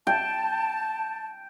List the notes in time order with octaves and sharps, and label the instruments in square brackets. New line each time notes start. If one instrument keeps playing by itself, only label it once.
[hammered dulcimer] G5 [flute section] A5